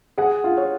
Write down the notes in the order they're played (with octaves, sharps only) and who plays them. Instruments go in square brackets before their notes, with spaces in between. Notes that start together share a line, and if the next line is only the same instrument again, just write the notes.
[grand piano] G#4 [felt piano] F#5
[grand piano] F4
[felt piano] C#5